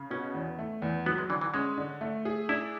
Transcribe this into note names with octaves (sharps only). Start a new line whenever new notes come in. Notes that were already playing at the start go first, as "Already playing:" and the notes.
Already playing: C#3
B2 C#4
E2
A3
E2
F#3 B3
G#3
D3 E3
E3
G#3 C#4
D3
A3
G#4
D4 E4